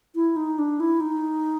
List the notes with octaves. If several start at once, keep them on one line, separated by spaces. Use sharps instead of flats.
E4
D#4
D4
E4
D#4